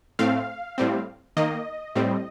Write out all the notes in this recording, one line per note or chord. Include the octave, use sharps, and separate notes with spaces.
A2 A3 C4 F5
A2 G3 C4
D#3 A#3 D#5
A2 G3 C4